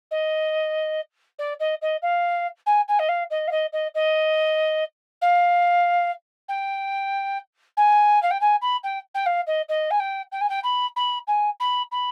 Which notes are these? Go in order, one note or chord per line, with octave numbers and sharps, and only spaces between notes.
D#5
D5
D#5
D#5
F5
G#5
G#5
D#5
F5
D#5
F5
D#5
D#5
D#5
F5
G5
G#5
F5
G5
G#5
B5
G5
G5
F5
D#5
D#5
G#5
G5
G5
G#5
G5
B5
B5
G#5
B5
B5